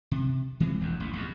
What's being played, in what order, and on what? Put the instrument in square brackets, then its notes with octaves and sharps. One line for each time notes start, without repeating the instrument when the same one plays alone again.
[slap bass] C3
E3 G#3 C4
E1 A#1 E2
A1 D#2
B1 E2 G2